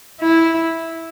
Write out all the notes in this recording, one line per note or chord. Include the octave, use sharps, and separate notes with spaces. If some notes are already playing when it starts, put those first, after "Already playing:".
E4